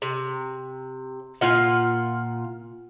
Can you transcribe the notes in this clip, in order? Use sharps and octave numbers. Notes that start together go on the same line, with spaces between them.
C3
A#2 F4 F#5